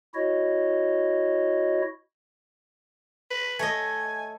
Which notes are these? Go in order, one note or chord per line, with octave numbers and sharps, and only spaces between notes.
E4 F#4 C#5 D#5
B4
A3 C#5 D#5 G#5